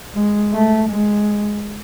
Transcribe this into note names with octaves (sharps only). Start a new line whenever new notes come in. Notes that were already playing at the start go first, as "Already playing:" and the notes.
G#3
A3
G#3